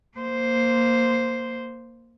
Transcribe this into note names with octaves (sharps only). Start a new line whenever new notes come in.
A#3 C5